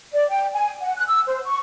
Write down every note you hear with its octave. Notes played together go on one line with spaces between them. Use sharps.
D5
G5
G#5
F#5
F#6
E6
C5
C#6